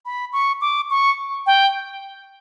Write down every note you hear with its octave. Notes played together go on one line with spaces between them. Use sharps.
B5
C#6
D6
C#6
G5